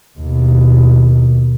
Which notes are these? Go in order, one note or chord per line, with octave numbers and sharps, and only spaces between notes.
D#2 B2